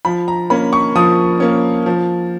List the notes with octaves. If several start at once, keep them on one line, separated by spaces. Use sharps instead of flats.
F3 B5
A#5
A#3 C#4 B5
C#6
F3 D#6
A#3 C#4
F3